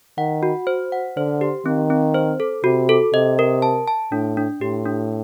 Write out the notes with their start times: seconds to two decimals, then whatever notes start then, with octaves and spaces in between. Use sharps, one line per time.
0.18 D#3 F#5
0.43 F#4
0.67 C5
0.92 F#5
1.17 D3 C5
1.41 G4
1.65 D#3 C4
1.90 C4
2.14 C5
2.40 A4
2.64 C3 F#4
2.89 A4
3.13 C3 D#5
3.39 A#4
3.62 A5
3.87 A5
4.12 A2 D4
4.37 D4
4.61 A2 G4
4.85 D4